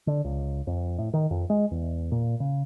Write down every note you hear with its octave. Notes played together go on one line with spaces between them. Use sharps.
D3
C#2
F2
A2
D#3
F2
G#3
E2
A#2
C#3